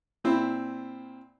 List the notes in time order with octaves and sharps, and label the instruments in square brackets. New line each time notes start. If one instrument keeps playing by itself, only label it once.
[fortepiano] A#2 C4 E4